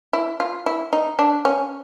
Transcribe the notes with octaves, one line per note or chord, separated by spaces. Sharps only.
E4
F4
E4
D#4
D4
C#4